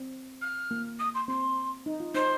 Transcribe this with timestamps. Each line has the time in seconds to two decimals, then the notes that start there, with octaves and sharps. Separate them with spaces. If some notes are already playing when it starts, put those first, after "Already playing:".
Already playing: C4
0.41 F6
0.71 A#3
0.99 D#6
1.14 C6
1.28 C4 C6
1.86 D#4
2.00 F4
2.14 D#4 C5